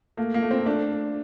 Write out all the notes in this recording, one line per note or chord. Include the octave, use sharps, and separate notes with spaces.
A3 A#3
A#3
A3
C4
A3 D4
A3